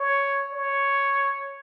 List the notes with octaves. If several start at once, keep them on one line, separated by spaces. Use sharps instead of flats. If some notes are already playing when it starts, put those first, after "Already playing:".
Already playing: C#5
C#5